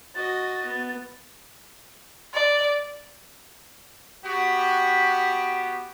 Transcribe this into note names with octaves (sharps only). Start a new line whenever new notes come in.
F#4 D#5 A6
B3
D5
B3 F#4 G4